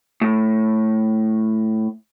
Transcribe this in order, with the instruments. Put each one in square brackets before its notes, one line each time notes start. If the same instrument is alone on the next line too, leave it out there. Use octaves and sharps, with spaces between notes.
[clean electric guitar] A2